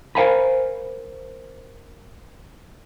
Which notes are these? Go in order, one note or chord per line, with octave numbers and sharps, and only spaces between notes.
A#4 C5 F5 G#5 A#5 B5